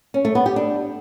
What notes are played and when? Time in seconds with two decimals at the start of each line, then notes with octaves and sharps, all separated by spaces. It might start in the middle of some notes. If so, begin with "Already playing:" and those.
0.14 C#4
0.25 A3
0.35 B3
0.46 G4
0.56 D4